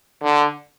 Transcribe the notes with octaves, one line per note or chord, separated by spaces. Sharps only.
D3